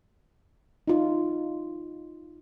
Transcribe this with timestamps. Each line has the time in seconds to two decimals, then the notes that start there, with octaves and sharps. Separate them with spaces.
0.88 D#4 F4